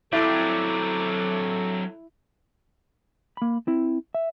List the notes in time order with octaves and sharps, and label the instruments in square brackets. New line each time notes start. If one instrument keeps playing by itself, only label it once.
[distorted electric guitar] F#3 C4 [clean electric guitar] G3 D4 G4 [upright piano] E4 [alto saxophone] A4
[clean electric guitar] A#3 B5
C4 E4
E5